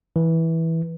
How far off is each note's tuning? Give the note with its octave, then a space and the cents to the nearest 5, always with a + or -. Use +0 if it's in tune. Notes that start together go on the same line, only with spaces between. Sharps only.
E3 -10